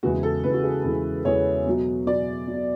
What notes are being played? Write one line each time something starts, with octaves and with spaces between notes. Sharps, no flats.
E2 C#3 E3 G#3 F#4
A4
E2 C#3 E3 G#3 B4
F#4
G#4
E2 C#3 E3 G#3 A4
E2 C#3 E3 G#3 C#5
B2 F#3
B2 F#3 D5
B2 F#3